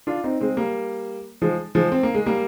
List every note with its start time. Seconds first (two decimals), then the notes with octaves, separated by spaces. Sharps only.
0.07 D4 F4
0.24 C4 D#4
0.41 G#3 C4
0.57 G3 A#3
1.42 F3 G#3
1.75 F3 G#3
1.92 C4
2.03 A#3
2.14 G#3
2.26 G3 A#3